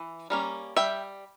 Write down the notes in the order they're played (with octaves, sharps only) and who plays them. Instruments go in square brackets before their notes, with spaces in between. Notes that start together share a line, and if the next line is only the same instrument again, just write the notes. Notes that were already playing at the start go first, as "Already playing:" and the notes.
Already playing: [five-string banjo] E3
G3 A#3 C#4
G3 E5 G5